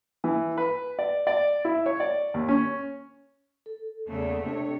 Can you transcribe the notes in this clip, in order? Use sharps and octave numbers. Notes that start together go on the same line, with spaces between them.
E3
B4
D5
D5
E4
C#5
D5
D#2
C#4
A4
E2 C#3 A3 A#3
C3 D4 C#5